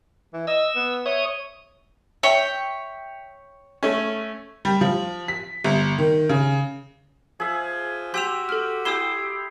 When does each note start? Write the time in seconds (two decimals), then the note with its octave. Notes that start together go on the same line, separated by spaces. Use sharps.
0.33 E3
0.47 D#5 E6
0.76 B3
1.06 C#5 E5 D#6
2.23 C#5 E5 G5
3.83 A3 C#4
4.65 G3
4.81 F3
5.28 B6
5.64 G1
5.98 D#3
6.29 C#3
7.40 F3 G#4 E5
8.14 F#4 G4 C6 E6 G6 E7 F7
8.49 A4 F6
8.85 E4 G4 D#6 E6 G6 C7 E7 G7